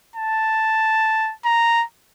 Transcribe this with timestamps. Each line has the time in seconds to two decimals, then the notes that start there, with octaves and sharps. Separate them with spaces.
0.16 A5
1.45 A#5